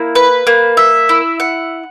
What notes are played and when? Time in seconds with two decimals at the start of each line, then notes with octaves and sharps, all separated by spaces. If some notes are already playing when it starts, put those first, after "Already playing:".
Already playing: A#3 E4
0.15 B4
0.47 A#3
0.77 E5
1.09 E4
1.40 F#5